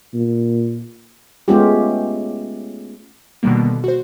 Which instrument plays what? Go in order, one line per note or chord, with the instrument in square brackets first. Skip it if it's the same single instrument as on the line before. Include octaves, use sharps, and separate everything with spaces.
[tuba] A#2
[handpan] G#3 A3 B3 C#4 F4 G4
[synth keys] B2 D3 D#3 G3 A#3
F#4 C5